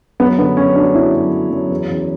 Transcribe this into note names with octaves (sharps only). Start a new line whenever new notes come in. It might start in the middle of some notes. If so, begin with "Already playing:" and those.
F#2 B3
D3 B3
F#2 C#4
F#3 D4
F#2 E4
F#2
F#2
F#2
E2
E2